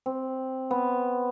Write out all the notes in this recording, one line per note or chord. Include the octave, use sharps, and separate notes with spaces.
C4
B3